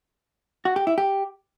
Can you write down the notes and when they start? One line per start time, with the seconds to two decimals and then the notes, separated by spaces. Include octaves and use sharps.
0.65 F#4
0.76 G4
0.87 E4
0.98 G4